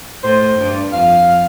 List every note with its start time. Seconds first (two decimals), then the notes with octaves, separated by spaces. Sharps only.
0.23 A2 C5
0.58 G2
0.93 F2 F5